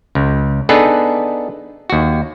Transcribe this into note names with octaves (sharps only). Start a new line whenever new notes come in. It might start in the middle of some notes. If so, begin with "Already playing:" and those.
C#2
B3 D4 D#4 G#4 A4 B4
D#2 F#4